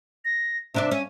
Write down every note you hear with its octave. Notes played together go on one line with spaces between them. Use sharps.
A#6
C3 D4 D5 E5
C#4